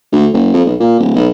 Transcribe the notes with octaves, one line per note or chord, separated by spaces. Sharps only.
D2
F#1
F2
B1
A#2
D1
B1